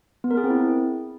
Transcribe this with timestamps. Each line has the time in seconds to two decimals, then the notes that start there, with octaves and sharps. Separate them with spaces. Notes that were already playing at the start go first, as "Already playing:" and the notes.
0.24 B3
0.31 A#4
0.37 G#4
0.44 C4
0.50 E4